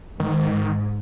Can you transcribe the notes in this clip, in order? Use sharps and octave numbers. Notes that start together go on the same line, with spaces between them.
G#2 D#3